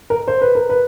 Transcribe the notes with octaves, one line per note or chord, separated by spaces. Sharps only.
A#4
C5
B4
A#4
B4